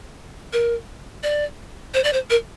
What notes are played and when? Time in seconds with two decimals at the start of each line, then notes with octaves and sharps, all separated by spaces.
0.53 A#4
1.23 D5
1.94 C5
2.04 D5
2.13 C5
2.30 A#4